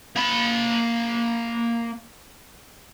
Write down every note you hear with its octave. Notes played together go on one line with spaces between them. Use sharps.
A#3 B5